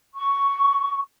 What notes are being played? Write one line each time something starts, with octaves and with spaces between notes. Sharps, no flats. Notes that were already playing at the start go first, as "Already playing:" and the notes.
C#6